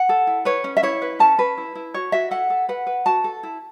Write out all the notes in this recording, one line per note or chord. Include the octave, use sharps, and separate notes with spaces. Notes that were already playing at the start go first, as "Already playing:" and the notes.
Already playing: F#5
A4
E4
B4 C#5
C#4
E5
E4 C#5
B4
C#4 A5
C#4 B4
E4
E4
F#4 C#5
F#4 E5
A4 F#5
A4
B4 F#5
B4
F#4 A5
A4
E4